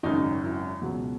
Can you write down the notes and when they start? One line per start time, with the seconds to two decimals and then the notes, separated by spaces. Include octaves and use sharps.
0.03 G#1 F#2 C#3 D#4
0.43 E4
0.82 C#2 B2 F#3